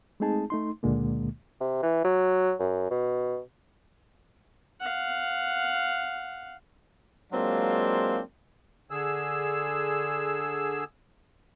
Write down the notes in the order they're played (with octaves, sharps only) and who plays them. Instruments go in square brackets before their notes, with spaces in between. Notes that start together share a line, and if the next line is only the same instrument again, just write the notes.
[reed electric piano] G#3 A3 C4 D#4 G#4 A5
A3 D#4 C6
C#2 A#2 D3 G#3 A#3
[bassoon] C3
E3
F#3
F#2
B2
[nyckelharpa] F5 F#5
[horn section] F#3 G#3 A#3 C4 D4 F4
[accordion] D3 G#4 E6